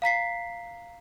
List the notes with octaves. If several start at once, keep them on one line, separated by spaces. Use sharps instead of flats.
F5 A#5 B6 C7